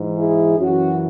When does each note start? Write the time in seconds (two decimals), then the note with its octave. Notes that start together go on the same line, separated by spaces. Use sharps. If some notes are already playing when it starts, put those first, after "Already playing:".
Already playing: G#2 E3
0.18 E4 G#4
0.58 F#2 E3 C#4 F#4